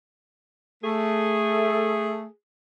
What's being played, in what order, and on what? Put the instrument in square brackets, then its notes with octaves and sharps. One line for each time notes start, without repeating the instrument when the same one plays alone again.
[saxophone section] A3 [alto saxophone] G#4